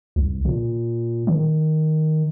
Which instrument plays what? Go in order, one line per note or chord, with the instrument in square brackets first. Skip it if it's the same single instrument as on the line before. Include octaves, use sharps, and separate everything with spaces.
[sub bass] C2
A#2
D#3